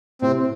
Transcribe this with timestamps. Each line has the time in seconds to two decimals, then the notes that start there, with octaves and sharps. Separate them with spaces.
0.22 A2 C3 C4